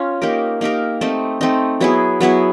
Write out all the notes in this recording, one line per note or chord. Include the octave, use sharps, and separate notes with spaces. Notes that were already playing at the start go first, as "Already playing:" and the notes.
Already playing: C#4 F4
A#3 D#4 G4 A#4
A#3 D#4 G4 A#4
A3 C4 D#4
A3 C4 D#4
F#3 B3 E4 G#4
F#3 B3 E4 G#4